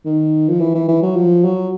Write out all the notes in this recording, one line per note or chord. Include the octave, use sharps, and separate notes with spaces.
D#3
F3
E3
E3
E3
F#3
F3
F#3